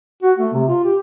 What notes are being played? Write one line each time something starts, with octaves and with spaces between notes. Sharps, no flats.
F#4
A3
C3
F4
G4